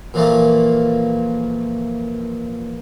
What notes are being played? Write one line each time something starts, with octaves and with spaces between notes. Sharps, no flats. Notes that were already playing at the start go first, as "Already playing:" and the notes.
A#2 E3 F3 A3 A#3